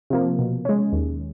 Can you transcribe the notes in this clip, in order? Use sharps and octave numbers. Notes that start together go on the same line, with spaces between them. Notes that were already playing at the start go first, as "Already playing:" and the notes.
C3 F3 A#3
B2
G#3 C#4
D#2